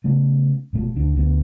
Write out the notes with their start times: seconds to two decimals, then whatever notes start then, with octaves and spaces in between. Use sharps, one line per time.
0.04 C#3 A3 B3
0.73 F1 B2 A3
0.96 D2 D4
1.17 D2 B3